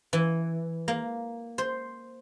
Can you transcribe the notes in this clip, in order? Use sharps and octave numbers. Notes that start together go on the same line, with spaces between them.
E3
A#3
C5